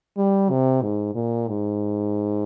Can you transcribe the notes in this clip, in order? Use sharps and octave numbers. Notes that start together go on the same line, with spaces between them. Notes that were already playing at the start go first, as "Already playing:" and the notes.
G3
C3
G#2
A#2
G#2